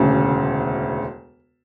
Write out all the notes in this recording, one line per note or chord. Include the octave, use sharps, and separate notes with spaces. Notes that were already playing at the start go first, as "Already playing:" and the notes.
Already playing: E1 D2 C#3